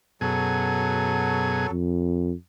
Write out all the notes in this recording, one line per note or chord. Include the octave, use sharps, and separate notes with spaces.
F#2 B2 F#3 G#4 A4
F2